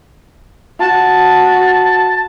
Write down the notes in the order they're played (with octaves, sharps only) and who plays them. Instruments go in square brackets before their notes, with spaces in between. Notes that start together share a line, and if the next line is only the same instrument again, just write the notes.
[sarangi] F#4 [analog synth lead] A5